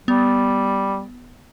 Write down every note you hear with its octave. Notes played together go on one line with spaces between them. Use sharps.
G3 B3